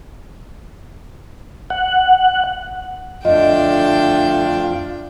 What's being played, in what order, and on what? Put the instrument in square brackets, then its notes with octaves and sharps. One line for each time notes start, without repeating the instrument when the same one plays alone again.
[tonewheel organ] F#5
[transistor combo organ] F2 F4 [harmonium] D3 A3 [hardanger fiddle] D4 G5 [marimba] D#5